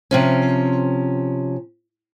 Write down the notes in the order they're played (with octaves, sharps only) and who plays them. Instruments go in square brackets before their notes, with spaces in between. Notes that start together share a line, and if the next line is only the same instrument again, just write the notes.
[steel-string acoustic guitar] C3 F3 C#4